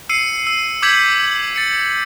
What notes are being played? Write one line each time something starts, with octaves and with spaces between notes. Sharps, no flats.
E6 C7 C#7 D#7
E6
D6 E6 G6 G#6 B6 F#7
A6 C#7